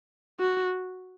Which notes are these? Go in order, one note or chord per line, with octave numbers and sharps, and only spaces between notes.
F#4